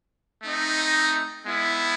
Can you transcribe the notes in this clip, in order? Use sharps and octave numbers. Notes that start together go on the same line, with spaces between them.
A3 C4 D#4
G#3 B3 E4